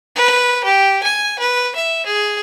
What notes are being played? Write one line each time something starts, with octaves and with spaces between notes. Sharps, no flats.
B4
G4
G#5
B4
E5
G#4